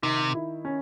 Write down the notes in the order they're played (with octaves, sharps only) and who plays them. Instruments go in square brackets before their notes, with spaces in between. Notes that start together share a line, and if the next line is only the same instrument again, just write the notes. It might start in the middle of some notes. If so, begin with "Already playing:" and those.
[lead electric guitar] C3 [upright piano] D#3
[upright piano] E4
C#4